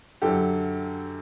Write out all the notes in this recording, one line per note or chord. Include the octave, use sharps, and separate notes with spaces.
F#2 D3 F#3 G4 A4